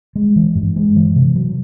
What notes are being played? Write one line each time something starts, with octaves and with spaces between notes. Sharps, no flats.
G#3
E3
G2
G#3
E3
C3
F#3